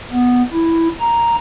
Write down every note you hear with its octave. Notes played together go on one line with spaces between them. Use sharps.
B3
E4
A#5